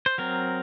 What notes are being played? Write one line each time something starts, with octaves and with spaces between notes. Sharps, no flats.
C5
F#3 C4 A#4